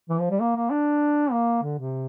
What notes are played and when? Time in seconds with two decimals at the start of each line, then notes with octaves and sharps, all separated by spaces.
0.09 E3
0.19 F3
0.31 G3
0.40 A#3
0.56 A#3
0.70 D4
1.32 A#3
1.63 D3
1.78 C3